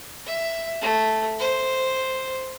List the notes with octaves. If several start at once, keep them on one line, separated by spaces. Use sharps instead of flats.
E5
A3
C5